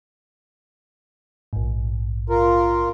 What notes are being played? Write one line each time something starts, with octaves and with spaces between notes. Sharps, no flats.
A#1 G#2
F4 A#4